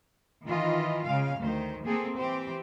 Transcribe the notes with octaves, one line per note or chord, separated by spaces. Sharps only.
D#3 E3 F4 D#5
C#3 G#3 F5
D2 D#3 C5
A#3 C4 G#4 A4
E3 C4 G4 C5